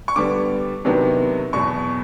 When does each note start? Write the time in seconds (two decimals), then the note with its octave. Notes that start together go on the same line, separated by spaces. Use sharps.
0.08 C#6
0.16 D3 G3 B3 D6
0.85 C3 D#3 F#3 B3 D4
1.53 E2 B2 F#3 C#6